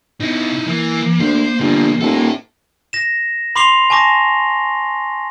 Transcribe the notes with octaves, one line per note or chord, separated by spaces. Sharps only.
B2 D#4 E4
E3 A#3
D2 C5
G1 B2 D3 A#3
D#1 E4 A4
A#6 E7
B5 C6 D6 C7 F7 G7
G#5 A5 C#6 D6 A#6